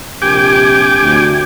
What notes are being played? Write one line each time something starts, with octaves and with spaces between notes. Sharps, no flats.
A#1 C3 G4 G5 G#5 D6
D2